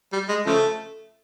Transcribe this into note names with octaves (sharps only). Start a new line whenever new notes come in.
G3
G#3
C#3 F3 A3